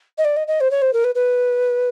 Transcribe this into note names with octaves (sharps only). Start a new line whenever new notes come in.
D#5
D5
D#5
D#5
C5
C#5
C5
A#4
B4
B4